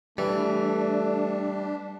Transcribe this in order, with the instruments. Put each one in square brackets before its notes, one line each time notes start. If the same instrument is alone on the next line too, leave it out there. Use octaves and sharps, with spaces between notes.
[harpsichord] E3 [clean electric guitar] G3 [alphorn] A3 [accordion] D4